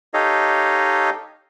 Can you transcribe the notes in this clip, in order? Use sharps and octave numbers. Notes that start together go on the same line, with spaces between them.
D#4 G4 A4 C#5 D#5 F5